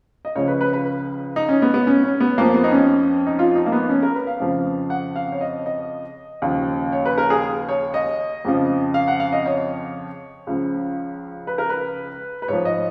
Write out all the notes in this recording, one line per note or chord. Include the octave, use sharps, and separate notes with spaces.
D#5
C#2 C#3 F3 C#5
B4
B4
B4
D#4
C#4
B3
B3
C#4
C#4
B3
F2 F3 A#3
B3
D#4
C#4
D#4
F4
D#4
A#3
B3
C#4
A#4
B4
F5
F2 C#3 F3
F#5
F5
C#5
D#5
D#5
D#2 C#3 F3
C#5
B4
A#4
G#4
C#5
D#5
F2 C#3 F3
F5
F#5
F5
D#5
C#5
C#2 C#3 F3
B4
A#4
B4
B4
G#2 F3 C#5
D#5